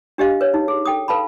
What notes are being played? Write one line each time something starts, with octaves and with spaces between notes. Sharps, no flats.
D4 G4 D#5 F5
B4 C#5
D#4
G#4
A4 G5 D#6
A4 B4 F5 A5 B5